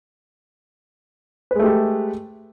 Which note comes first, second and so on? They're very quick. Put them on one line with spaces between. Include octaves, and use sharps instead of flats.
B4 G#3 A3 G4 A4